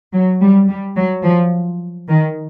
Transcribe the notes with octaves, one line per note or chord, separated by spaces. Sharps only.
F#3
G3
G3
F#3
F3
D#3